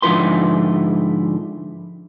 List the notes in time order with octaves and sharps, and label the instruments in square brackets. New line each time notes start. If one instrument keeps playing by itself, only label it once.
[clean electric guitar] G#2 D3 F3 E4 B4 C6